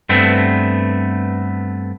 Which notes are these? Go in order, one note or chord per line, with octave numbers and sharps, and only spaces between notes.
G2 A3 B3 C4